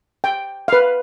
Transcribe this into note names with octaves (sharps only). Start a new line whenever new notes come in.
G5
B4 F5